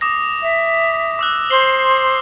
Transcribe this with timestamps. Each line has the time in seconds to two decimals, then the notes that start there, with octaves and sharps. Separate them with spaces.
0.01 D6 D#6 A#6
0.42 E5
1.19 D6 E6 F#6
1.50 C5 C7 F#7 G7